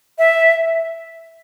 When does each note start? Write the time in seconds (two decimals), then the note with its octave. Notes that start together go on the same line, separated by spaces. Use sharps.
0.18 E5